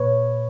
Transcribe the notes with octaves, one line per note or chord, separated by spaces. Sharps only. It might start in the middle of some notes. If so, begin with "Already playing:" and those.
Already playing: A#2 B4 C#5